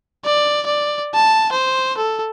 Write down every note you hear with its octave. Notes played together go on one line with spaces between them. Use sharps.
D5
D5
A5
C5
A4